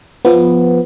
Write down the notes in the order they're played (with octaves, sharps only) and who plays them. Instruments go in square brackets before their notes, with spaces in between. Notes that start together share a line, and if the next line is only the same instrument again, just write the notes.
[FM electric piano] F3 B3